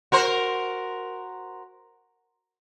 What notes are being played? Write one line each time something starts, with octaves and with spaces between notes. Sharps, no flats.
F#4 A#4 C5